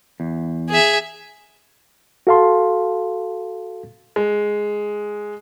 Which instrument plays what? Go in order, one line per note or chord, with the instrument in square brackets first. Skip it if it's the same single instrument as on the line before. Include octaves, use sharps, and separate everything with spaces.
[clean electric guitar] E2
[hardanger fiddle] G#4 E5
[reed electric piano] F#4 A4 F5 A5 C6
[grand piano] G#3